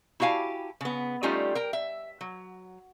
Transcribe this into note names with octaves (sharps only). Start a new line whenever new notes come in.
E4 F#4 G4 F5 G#5 A5
C#3 B3
G3 A3 C#4 D#4 F4 G4
A#4 G5
E5
F#3